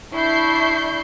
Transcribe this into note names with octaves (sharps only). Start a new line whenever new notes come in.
D4 E4 C#6 G6 C7